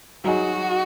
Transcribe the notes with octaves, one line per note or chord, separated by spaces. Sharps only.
F#3 D#4 F#4 G#4